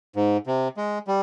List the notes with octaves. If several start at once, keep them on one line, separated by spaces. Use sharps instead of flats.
G#2
C3
G#3
G3